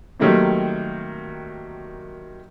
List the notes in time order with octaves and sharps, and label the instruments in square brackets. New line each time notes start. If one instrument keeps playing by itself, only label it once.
[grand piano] D#3 F#3 G3 A3 A#3 C4